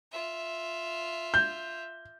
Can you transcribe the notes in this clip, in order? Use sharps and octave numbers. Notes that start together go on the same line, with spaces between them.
F4 E5
G6